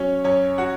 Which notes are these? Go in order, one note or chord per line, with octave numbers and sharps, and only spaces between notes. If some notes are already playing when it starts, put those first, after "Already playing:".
Already playing: F#3 C#4 C#5
F#2 C#4 C#5
F#4 F#5